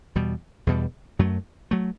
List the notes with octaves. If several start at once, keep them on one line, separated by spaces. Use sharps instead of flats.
E2 B2 G3
E2 B2 G3
F#2 F#3 A3
F#3 A3